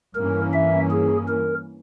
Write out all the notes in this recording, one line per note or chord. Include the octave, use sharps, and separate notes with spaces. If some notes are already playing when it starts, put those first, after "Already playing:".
G2 E3 A#3 C#4 A#4
E5
G#4
A#4